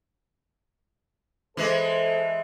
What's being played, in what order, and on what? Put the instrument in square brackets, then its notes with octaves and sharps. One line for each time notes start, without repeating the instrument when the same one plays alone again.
[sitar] E3 G#3 [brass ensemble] A4 C5